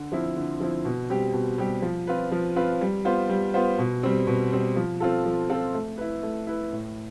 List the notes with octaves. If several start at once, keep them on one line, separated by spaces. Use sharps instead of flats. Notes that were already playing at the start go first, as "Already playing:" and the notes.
Already playing: D3
F3 C4 E4
D3
F3 C4 E4
B2
G3 C4 G4
B2
G3 C4 G4
F3
C4 F4 B4
F3
C4 F4 B4
G3
B3 F4 C5
G3
B3 F4 C5
B2
G3 C4
B2
G3 C4
F3
C4 F4 A4
F3
C4 F4 A4
A3
E4 B4
A3
E4 B4
A2